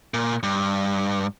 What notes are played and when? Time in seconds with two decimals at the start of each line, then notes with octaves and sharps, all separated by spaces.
0.14 A#2
0.43 G2